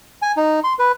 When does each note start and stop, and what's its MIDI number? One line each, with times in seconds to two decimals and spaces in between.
0.22 0.32 80
0.37 0.60 63
0.64 0.73 84
0.79 0.92 71